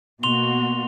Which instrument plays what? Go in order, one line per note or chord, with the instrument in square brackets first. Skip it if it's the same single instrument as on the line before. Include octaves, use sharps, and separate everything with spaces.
[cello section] B2 A#3 F#4 [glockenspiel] C6 F7 G7